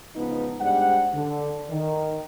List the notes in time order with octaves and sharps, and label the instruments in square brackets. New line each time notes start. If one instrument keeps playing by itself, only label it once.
[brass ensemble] C#2 F3 B3 D#4
G#2 G3 D4 F#5
D3
D#3